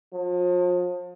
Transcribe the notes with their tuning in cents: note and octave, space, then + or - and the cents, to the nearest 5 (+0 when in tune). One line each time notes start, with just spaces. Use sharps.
F3 +40